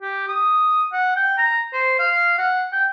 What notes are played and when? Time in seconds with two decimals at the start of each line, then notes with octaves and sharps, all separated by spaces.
0.01 G4
0.27 D#6
0.92 F#5
1.16 G5
1.38 A#5
1.73 C5
1.99 F5
2.38 F#5
2.72 G5